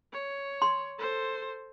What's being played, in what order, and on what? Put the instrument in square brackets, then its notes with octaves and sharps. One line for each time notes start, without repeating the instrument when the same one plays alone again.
[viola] C#5
[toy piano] C6
[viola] A4 C5